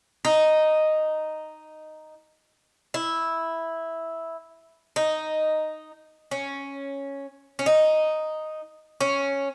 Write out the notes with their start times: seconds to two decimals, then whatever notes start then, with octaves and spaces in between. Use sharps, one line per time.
0.25 D#4
2.94 E4
4.96 D#4
6.31 C#4
7.59 C#4
7.66 D#4
9.01 C#4